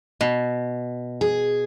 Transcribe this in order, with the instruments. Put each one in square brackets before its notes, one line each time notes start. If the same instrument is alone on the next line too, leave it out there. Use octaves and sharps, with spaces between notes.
[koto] B2
[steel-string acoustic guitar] G#4